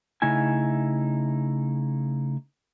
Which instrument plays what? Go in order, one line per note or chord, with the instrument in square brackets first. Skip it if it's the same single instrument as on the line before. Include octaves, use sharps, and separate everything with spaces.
[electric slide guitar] C#3 A3 D#4 E4 G#5